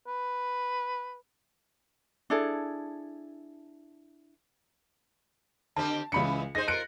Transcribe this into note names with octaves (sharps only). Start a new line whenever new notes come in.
B4
D4 E4 G#4 A4
D3 C4 G4 A5
C#2 C#3 E3 B5 C#7
D#4 G#4 C5 A#6
F4 A#4 F#6 C#7 D7